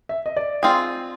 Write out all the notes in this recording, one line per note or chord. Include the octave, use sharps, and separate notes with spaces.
E5
D#5
D5
C4 F4 G#4